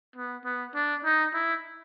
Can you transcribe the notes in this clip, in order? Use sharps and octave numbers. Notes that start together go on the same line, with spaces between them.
B3
B3
D4
D#4
E4